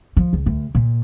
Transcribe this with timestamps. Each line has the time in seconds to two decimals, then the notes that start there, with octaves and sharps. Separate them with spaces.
0.17 F3
0.33 C#2
0.46 D2
0.75 A#2